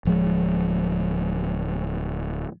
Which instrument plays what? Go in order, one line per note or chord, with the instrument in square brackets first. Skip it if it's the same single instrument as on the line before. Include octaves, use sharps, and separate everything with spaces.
[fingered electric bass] D1 F3 G#3